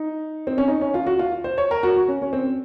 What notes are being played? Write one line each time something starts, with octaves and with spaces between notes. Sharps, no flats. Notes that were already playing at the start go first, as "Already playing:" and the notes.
Already playing: D#4
C4
C#4
D#4
C#4
F4
F#4
F4
C5
C#5
A#4
F#4
F#4
C#4
C#4
C4